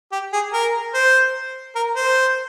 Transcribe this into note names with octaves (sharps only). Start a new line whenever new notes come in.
G4
G#4
A#4
C5
A#4
C5